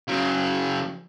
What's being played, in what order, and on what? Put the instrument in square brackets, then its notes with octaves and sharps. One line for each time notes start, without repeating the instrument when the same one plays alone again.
[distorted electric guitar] C#3 F#3